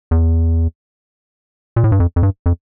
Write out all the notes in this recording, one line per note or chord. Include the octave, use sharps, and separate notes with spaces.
E2
A#2
A2
G2
F2
F2
G2
F2